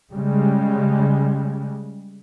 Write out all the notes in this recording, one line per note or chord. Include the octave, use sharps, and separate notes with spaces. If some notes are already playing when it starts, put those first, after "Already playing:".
C#3 G3 G#3